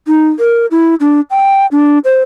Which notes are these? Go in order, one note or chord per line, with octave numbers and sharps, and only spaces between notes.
D#4
A#4
E4
D4
G5
D4
C5